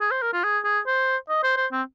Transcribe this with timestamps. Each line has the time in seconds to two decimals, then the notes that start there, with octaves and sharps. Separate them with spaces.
0.01 G#4
0.11 C5
0.22 A#4
0.33 F4
0.44 G#4
0.64 G#4
0.87 C5
1.29 D#5
1.43 C5
1.57 C5
1.72 C4